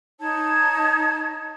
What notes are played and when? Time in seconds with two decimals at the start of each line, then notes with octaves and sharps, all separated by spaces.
0.20 D#4 C#5 A5 G#6